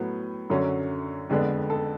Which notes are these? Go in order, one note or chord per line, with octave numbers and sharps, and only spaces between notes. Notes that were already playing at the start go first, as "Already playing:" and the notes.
Already playing: A2 F#3 B3
F#2 D3 F#3 C#4
F2 D3 G#3 B3 D4
A4